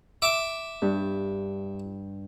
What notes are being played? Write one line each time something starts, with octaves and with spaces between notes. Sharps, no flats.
E5 D6
G2